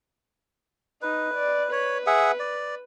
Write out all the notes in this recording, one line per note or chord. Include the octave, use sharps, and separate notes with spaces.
D#4 B4
D5
B4 C#5
G#4 E5 F#5
D5